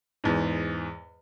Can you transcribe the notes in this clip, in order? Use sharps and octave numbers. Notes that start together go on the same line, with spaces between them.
E2 G#2